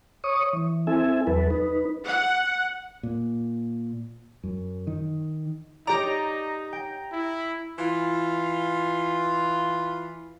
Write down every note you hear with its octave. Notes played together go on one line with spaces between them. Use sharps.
C#5 C#6 D#6
E3
C4 E4 A4 E5 G#5
E2 F#3 A4 B4
D#4 B4
F#5
A#2
F#2
D#3
D#4 G4 D5 A#5
G5
E4
E3 F4